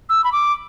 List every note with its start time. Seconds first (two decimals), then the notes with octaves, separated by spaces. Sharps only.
0.09 E6
0.24 B5
0.32 D6